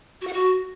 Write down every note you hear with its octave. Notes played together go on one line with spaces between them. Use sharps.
F#4
F#5
F#4